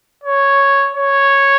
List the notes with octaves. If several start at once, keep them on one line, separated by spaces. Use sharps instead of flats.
C#5
C#5